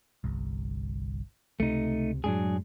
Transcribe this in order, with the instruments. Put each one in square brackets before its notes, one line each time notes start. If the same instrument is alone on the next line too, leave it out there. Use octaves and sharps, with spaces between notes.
[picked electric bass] G1 C2
[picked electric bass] C#2 C3 [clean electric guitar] A3 D#4
[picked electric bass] F#2 A2 G#3 [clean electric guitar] F#3 D4 G#4